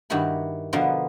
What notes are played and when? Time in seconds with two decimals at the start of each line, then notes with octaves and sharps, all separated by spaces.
0.10 G2 D#3 E4 F#4 B5
0.73 B2 D3 F3 B3 F4 A#4